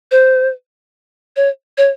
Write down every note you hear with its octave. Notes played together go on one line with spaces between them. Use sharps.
C5
C#5
C#5